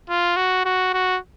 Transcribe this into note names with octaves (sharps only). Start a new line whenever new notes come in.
F4
F#4
F#4
F#4